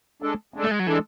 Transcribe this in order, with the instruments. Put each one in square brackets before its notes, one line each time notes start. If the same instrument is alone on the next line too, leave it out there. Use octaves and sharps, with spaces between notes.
[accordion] G#3 D4 A4
G#3 D4 A4
[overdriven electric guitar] A3
G#3
F#3
[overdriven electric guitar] E3 [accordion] G#3 D4 A4